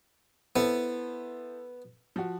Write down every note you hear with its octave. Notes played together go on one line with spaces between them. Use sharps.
B3 E4 A4 C5
F3 F#4